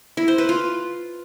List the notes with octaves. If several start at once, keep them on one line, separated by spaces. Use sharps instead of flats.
E4
C5
B4
F4